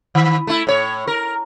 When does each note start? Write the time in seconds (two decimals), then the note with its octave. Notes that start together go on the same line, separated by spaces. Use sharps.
0.15 D#3
0.47 A3 E4
0.67 A2 C#5
1.07 A#4